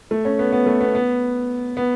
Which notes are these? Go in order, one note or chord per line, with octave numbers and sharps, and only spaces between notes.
A3
C#4
B3
B3
A3
B3
B3
B3